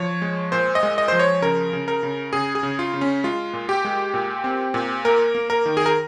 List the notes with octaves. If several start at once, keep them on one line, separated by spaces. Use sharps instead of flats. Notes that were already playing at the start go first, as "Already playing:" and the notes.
Already playing: F3 C#5
G#3
A#2 C5
D#5
G#3
D#5
F3 C5
C#5
C#3 A#4
C#3
A#4
C#3
C#3 G#4
G#4
C#3
F4
C#3
C#4
G#3 F4
A#2
G4
G#3
A#2
C4
A#2
A#3 A#4
A#3
A#4
D#3
G#4
A#4